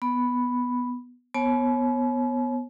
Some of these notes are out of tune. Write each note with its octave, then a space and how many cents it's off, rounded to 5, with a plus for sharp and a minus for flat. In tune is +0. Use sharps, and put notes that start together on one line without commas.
B3 +0 B5 +0
B3 +0 C#5 -30 A5 -45